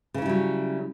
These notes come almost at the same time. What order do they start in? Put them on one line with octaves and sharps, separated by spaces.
C#3 C#4 E4 G3 F#3